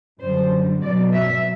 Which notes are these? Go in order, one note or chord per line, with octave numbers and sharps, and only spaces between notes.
F#2 D3 G3 C5
B2 F#3 C4 D5
E5